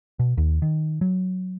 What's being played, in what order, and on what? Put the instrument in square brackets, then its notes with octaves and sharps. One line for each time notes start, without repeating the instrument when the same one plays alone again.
[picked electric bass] B2
D#2
D#3
F#3